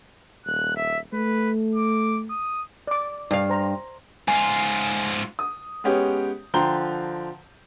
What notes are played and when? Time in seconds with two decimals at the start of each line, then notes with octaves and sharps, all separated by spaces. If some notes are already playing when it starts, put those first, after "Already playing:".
0.46 D#1 F#6
0.76 E5
1.13 A3 B4
1.75 D6
2.30 D#6
2.87 D5 D6
3.31 G2 F5
3.50 C5 A#5
4.28 G#2 F4 G#5
5.39 D#6
5.84 G#3 B3 C#4 G4
6.54 D3 F3 G5 A#5 C6 G7